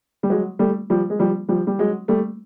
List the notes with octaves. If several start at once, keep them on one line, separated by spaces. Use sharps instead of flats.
G3
F#3 G#3
G3 A3
F3 G3
G#3
F3 G3
F3 G3
G3
F#3 G#3
G3 A3